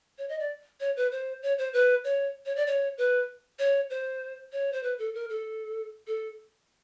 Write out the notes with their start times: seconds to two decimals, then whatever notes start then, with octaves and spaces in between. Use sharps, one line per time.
0.18 C#5
0.29 D#5
0.40 D5
0.80 C#5
0.97 B4
1.12 C5
1.43 C#5
1.58 C5
1.73 B4
2.04 C#5
2.46 C#5
2.56 D5
2.67 C#5
2.98 B4
3.59 C#5
3.90 C5
4.52 C#5
4.73 C5
4.83 B4
4.99 A4
5.14 A#4
5.30 A4
6.07 A4